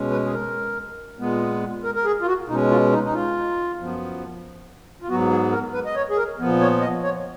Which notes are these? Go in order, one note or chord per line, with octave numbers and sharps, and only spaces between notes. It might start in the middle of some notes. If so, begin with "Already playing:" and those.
Already playing: B2 G#3 C#4
B4
G#4
A#4
A#2 G#3 B3
A#4
A#4
G#4
F4
F#4
B2 G#3 C#4 D#4
F4
D#4
D#4
F4
F#2 F3 B3
F4
G#2 F#3 B3 F#4
G#4
A#4
B4
D#5
C#5
G#4
A#4
A#2 F3 B3
C#5
D#5
C#5